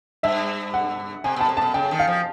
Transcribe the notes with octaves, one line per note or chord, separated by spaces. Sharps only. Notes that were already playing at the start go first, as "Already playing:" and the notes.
G2 E5
F#5
C3 G#5
B2 A5
C3
B2 A5
C#3 G5
D#3
F5
F3